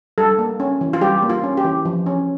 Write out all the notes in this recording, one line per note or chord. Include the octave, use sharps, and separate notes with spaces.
G3 A4
A#3
C#4
E3
F4
G3 G4
A#3
F4
C#4
G4
E3
F3
C#4